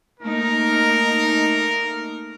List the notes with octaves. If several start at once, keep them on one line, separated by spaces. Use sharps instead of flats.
A3 A#3 D#4 A#4